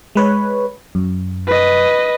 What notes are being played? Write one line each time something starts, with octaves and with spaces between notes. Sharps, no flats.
G#3 B4 C#5
F#2
B4 D#5